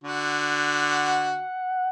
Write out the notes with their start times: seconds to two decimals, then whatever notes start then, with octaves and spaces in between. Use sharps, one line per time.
0.04 D3 F#4
0.82 F#5